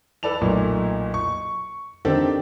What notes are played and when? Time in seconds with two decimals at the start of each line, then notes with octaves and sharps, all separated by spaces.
0.23 A4 B4 D5 A5 F7
0.41 B1 A#2 A3
1.14 C#6
2.05 D#3 C4 D4 G4 A4